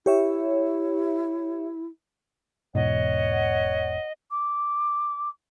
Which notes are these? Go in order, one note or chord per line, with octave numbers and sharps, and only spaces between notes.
E4 G4 C#5 E5
E1 G#2 B2 C#5 D#5 F#5
D6